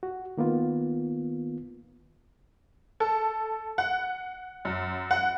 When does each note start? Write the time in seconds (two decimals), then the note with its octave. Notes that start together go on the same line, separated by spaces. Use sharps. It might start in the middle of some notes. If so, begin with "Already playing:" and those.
0.03 F#4
0.38 D#3 A#3 B3 F4
3.00 A4
3.78 F#5
4.65 F#2
5.11 F#5